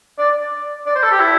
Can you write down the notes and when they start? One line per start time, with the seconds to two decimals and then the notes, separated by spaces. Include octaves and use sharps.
0.18 D5
0.86 D5
0.95 C5
1.03 A4
1.11 G4
1.20 E4